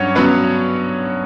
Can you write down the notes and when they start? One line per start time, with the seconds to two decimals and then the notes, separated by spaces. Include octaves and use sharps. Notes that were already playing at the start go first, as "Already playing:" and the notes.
Already playing: G2 F#3 C#4 C#5 F#5
0.15 F#3 B3 C#4 B4